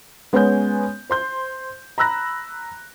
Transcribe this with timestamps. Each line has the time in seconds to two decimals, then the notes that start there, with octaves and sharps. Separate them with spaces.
0.33 G#3 B3 C#4 C#5 G#5 G6
1.10 C5 C6 G6
1.98 A#5 B5 E6 F#6 A#6